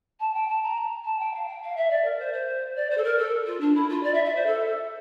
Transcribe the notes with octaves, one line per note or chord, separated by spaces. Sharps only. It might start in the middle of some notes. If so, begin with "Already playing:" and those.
A5
G5
A5
A#5
A5
G5
F5
G5
F5
E5
D5
A#4
C5
C5
D5
C5
A4
A#4
A4
F4
D4
E4
F4
D5
E5
E5
C5
A4